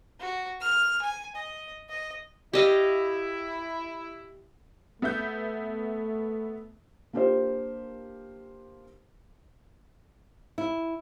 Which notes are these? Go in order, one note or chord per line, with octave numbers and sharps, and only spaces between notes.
F#4
F6
G#5
D#5
D#5
E4 G4 D#5 F5
A3 B3 E5 G6
A#3 D4 F4 G4 A#4 C5
E4